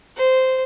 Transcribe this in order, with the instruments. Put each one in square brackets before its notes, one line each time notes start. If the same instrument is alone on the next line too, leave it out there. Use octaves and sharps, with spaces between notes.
[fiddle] C5